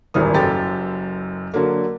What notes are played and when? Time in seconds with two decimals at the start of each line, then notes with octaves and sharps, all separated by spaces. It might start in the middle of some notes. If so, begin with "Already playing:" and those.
0.14 D#1 G#1 G2 E3 A#4 D#6
0.34 F#1 F#2 G4 A4 A6
1.54 D3 F#3 A#3